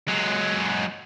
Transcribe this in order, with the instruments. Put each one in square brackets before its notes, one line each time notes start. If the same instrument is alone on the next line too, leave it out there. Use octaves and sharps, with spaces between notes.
[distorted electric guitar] F#3 G#3